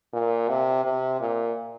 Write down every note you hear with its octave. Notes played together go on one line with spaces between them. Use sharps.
A#2
C3
C3
A#2